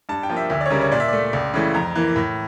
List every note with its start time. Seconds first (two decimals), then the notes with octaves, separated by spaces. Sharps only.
0.09 G2 A5
0.23 G5
0.30 F3 A#3
0.37 E5
0.50 D2 E5
0.61 D5
0.66 C#5
0.70 C#3 G3 A#4
0.82 C#5
0.92 A#2 D5
1.00 E5
1.08 A3 D5
1.33 C#2
1.54 C#3 E3 A3
1.74 F2 A#5
1.95 E3 A#3
2.16 A2